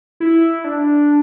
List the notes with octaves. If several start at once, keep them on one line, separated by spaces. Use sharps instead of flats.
E4
D4